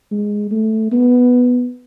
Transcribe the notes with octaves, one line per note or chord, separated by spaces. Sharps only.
G#3
A3
B3